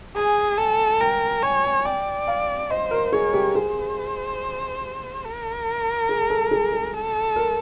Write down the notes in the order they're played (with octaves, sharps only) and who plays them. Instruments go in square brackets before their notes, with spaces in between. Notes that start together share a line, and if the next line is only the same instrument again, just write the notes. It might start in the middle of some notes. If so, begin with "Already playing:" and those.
[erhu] G#4 [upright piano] G#5
[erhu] A4 [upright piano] G#5
[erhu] A#4 [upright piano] G5
[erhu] C#5 [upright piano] G#5
[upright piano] G#5
[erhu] D5 [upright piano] G5
[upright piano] F5
[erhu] C5 [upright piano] D#5
[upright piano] A#4
[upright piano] G#4 [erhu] C#5
[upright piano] G4
[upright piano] G#4 [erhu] C5
[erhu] A#4
[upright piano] G#4
A4
G#4
G#4
[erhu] A4
[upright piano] A#4